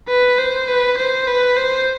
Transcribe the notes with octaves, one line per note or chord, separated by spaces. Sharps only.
B4
C5
B4
C5
B4
C5